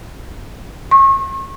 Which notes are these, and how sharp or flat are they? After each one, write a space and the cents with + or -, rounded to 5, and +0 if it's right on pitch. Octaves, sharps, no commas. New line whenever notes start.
C#6 -35